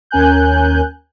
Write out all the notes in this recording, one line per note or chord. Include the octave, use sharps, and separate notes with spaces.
D#2 C#4 A#4 G#5 F#6 G6